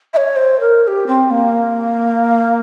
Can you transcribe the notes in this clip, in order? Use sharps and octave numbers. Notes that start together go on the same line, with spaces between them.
E5
C#5
C5
A#4
A#4
G4
C4
A#3